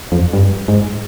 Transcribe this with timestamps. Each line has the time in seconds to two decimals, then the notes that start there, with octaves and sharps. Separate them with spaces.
0.12 F2
0.33 G2
0.68 G#2